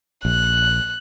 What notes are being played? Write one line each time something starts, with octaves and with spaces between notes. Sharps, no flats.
A#1 F#6